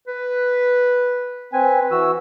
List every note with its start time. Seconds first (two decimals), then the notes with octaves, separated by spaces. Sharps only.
0.07 B4
1.53 C4 B4 G#5
1.91 E3 F#4 E6